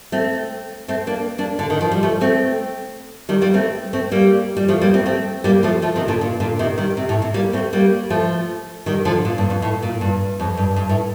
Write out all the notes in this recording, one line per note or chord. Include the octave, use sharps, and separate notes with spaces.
A3 C4
A3 C4
A#3 D4
A#3 D4
D3
D#3
F3
G3
F3 A3
A3 C4
D#3 G3
G3 A#3
A3 C4
A3 C4
G3 A#3
G3
F3 A3
G3 A#3
A3 C4
A3 C4
G3 A#3
F3 A3
F3 A3
C3 D#3
A#2 D3
A#2
A#2 D3
C3 D#3
D#3 G3
C3
A2
C3
G3 A#3
A3 C4
G3 A#3
F3 A3
D#3 G3
D3 F3
A#2
G2
F2
A2
A#2
G2
F2
G2
G2
A2